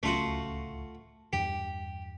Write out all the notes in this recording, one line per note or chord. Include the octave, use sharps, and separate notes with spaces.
D1 C#2 A3 C#4 F4 F#4
E2 G2 G4